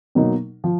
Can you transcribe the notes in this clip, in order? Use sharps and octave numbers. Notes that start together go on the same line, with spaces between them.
B2 F#3 A#3 D#4
F3